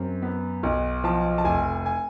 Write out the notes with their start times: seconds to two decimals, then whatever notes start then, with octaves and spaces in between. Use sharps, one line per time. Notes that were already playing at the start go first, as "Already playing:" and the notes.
Already playing: F#2 C4
0.22 B3
0.63 B1
1.04 F3 A5
1.38 A5
1.44 F1 G#5
1.86 G#5